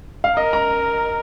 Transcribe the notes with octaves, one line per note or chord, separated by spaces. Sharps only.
F5
A#4 D#5
A#5